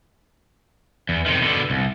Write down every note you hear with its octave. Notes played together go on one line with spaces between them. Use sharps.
E2
C3 D#3
B2 D3
C2